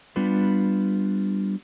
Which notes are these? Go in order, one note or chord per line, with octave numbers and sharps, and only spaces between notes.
G3 B3 D4 F4 B4